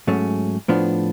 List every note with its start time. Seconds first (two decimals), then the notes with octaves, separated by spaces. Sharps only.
0.07 G#2 F#3 A3 C#4
0.68 A2 F3 B3 D4